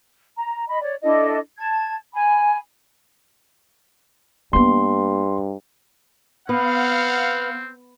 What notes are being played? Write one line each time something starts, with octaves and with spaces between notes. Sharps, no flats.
A#5
D#5 B5
C#5 D5
D4 E4 A4 D#5
A5 G#6
G#5 B5
G2 A#3 B3 C6
B3 C4 F5 F#5